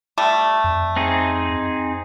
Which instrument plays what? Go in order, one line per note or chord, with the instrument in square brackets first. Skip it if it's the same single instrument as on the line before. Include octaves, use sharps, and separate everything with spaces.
[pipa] G3 A3
[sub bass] F2
[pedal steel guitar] C4 D#4 G#4